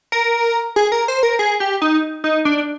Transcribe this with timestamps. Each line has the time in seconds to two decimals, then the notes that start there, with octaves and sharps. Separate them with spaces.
0.12 A#4
0.76 G#4
0.92 A#4
1.08 C5
1.23 A#4
1.39 G#4
1.60 G4
1.82 D#4
2.24 D#4
2.45 D4